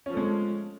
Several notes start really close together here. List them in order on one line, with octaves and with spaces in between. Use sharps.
C#4 F3 A3 G#3